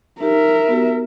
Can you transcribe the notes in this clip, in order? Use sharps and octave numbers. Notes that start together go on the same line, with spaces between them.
D#4 G4 A#4 E5
B3 F#4 G4